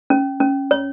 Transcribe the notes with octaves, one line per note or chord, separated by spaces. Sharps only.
C#4
C#4
C#5